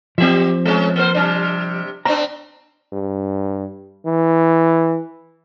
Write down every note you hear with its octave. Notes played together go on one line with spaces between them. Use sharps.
F3 F#3 C4 G4 E5
G#3 C#4
A#3 A#4 C5
C3 G3 D4
B3 C4 D4 A#5
G2
E3